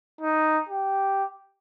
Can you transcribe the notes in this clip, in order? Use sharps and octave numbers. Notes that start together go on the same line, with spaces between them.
D#4
G4